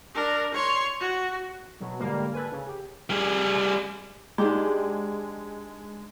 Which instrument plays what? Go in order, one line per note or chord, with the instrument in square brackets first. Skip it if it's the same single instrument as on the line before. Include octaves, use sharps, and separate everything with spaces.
[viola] D4 A#4
C#5 C6
F#4
[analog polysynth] B2 F#3
G#2 D3 G3 A#3
A4 B4 G#5
C#3
G4
[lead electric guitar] G3 G#4
[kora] G#2 D4 G4 [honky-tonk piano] G#3